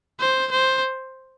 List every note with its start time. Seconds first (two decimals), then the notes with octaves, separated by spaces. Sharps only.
0.20 C5
0.51 C5